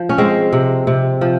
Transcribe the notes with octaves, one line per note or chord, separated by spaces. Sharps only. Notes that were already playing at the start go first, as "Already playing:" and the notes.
Already playing: F3
C#4
G#3 C4
C3
C3
F3